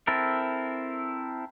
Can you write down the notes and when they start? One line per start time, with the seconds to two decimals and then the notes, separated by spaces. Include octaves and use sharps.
0.07 C4 E4 A4 A#4